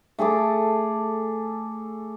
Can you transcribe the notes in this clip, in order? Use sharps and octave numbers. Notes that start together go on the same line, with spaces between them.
A3 G#4 A4 D6